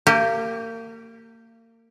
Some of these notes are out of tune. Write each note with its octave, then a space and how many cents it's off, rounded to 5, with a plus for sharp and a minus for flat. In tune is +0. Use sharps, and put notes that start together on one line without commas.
A#3 -35 G4 +0